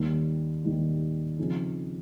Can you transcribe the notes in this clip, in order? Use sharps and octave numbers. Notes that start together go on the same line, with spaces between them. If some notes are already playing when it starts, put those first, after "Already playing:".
Already playing: D#2 D#3 G3 A#3 D#4
D#2 D#3 G3 A#3 D#4
C#3 F3 C4 D#4 G#4